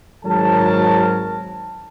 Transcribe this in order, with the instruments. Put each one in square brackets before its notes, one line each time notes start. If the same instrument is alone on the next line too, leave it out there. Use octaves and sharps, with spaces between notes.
[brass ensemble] G#1 G#2 F#3 A#4 A5